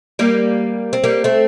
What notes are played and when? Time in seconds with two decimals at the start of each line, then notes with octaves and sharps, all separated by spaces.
0.19 G3 A#3
0.93 C4
1.04 G3 A#3
1.24 A3 C4